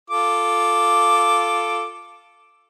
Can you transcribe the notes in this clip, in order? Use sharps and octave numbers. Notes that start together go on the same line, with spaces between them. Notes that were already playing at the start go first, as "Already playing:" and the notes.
F4 A4 D6